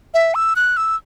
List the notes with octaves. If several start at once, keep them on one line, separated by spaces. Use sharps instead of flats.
E5
E6
F#6
E6